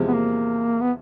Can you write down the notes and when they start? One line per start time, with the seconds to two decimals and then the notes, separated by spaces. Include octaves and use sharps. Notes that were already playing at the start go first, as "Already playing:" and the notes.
Already playing: E2 C3 F3 G#3
0.08 B3
0.13 A#3
0.81 B3